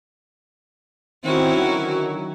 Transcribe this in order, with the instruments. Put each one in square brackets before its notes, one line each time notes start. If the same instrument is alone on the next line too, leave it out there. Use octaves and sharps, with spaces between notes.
[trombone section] D#3 C4 [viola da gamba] C#4 E4 F#4
[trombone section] D3 D#3 F#3